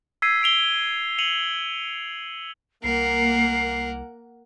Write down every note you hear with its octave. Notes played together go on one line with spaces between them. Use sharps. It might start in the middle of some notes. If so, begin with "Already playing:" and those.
E6 G#6 B6 C7 D#7
E6 D7 F7 G7
C#7 D#7 F7 F#7
C2 A#3 A#4 F#5 C7